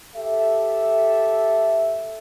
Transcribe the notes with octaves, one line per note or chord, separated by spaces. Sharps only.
G4 A4 E5